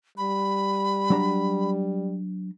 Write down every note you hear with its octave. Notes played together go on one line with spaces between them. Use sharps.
G3 B5
F#3 D4 A#5